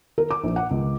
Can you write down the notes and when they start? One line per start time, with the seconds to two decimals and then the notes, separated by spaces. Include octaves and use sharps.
0.18 A#4
0.31 D6
0.44 A#1
0.56 F#5
0.71 C#2